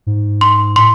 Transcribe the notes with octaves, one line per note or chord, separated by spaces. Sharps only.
G#2
C6
A2 C6